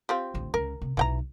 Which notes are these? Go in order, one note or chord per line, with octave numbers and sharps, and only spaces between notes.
C4 F4 G4
A1 D2
C#2 C#3 A#4
C3
B1 B2 E3 G5 A#5